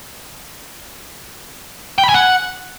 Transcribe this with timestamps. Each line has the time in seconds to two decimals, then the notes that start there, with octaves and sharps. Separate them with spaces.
1.98 G5
2.04 B5
2.09 G#5
2.14 F#5